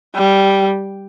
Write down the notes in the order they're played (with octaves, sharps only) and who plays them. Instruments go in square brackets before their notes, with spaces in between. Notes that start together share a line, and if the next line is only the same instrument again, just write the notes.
[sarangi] G3